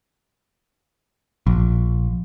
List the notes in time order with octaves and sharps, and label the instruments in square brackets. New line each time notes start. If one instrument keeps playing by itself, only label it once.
[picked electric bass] A#1